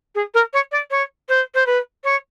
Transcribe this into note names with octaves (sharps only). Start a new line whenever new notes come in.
G#4
A#4
C#5
D5
C#5
C5
C5
B4
C#5